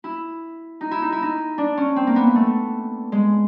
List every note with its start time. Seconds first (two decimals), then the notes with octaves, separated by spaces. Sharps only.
0.04 E4
0.81 D#4
0.91 E4
1.02 D#4
1.12 E4
1.22 D#4
1.58 D4
1.77 C#4
1.96 C4
2.07 A#3
2.16 B3
2.36 A3
3.12 G#3